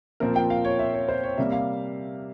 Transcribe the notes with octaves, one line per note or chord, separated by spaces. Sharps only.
A#2 F3 C4 A#4
G5
F5
C#5
E5
C#5
C5
C#5
C3 G3 A#3 E5
F5